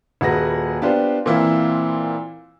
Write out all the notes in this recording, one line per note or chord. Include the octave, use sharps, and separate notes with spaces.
D#1 F#4 G#4 B4 A#6
B3 D4 F4 G4 C5
A#2 E3 C4 E4 F4